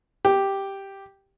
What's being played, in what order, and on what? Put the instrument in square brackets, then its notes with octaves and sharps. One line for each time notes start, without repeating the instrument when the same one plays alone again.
[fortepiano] G4